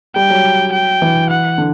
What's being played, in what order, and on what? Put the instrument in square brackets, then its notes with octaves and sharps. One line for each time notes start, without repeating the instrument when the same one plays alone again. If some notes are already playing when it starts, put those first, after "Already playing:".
[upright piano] G3 [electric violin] G5
[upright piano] F#3
[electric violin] G5
[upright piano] E3
[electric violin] F#5
[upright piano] D3